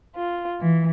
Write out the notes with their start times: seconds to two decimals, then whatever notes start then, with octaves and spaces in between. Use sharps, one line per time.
0.16 F4
0.61 E3